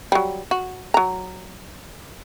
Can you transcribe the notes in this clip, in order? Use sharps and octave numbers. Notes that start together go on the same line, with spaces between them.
F#3 G3
F#4
F#3 A#5